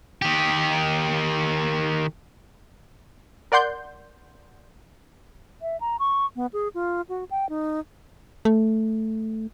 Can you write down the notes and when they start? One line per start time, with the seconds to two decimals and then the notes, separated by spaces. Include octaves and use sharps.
0.22 D#3 G4
3.52 A#4 D5 F#5 C6 G6
5.61 E5
5.81 A#5
6.00 C#6
6.36 B3
6.53 G#4
6.74 F4
7.09 F#4
7.31 G5
7.49 D#4
8.45 A3